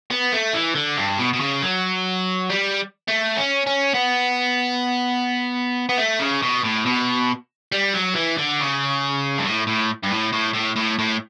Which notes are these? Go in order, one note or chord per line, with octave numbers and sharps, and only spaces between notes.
B3
A3
E3
D3
G2
B2
B2
C#3
F#3
G3
A3
C#4
C#4
B3
B3
A3
C#3
B2
A2
B2
G3
F#3
E3
D3
C#3
G2
A2
A2
G2
A2
A2
A2
A2
A2